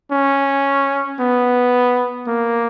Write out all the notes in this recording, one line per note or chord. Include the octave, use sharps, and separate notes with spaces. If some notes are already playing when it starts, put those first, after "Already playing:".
C#4
B3
A#3